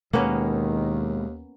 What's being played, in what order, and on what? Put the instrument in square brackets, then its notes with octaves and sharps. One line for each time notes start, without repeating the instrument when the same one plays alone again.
[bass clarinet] D#2 [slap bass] B2 G#3 [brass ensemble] D#3 [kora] A#3 B3 C#4